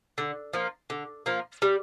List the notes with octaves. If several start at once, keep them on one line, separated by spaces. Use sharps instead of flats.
D3
F3 A#3
D3
F3 A#3
G3